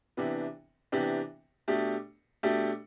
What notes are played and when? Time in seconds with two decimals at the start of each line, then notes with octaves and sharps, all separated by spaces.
0.17 C3 E3 B3 D4 G4
0.92 C3 E3 B3 D4 G4
1.68 B2 A3 D4 G4
2.43 B2 A3 D4 G4